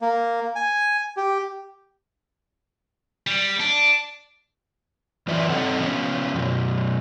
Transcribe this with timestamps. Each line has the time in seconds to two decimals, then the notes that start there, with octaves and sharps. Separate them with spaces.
0.01 A#3
0.56 G#5
1.17 G4
3.27 G3
3.60 D4
5.27 F#2 E3 F4 B4 D5 E5
5.49 G2 C4 A4 D#5 F#5
5.80 F3 B3 C#4
6.34 F#2 B2